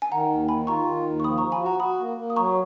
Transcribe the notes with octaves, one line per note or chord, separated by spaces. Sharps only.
G#5
D#3 F#5 A#5
D#2
D#3 G#5 B5
F4 A#5 C#6
D#3
D#2
C#6
F3 B5 D#6
F3 A#5 C#6
G#5 B5
F#4 F#5 A#5
F#4 B5 D#6
A#3
A#3
D#6
F#3 A#5 C#6